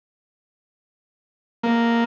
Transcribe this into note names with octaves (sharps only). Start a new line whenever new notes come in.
A#3